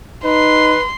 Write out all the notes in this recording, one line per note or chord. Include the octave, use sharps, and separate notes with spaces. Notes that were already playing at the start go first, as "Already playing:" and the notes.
D#4 B4 C6